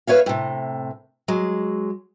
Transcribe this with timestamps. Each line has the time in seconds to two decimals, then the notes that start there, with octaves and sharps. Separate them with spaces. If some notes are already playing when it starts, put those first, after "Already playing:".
0.07 B4 C#5 E5 F5
0.26 A2 C3
1.28 F#3 G#3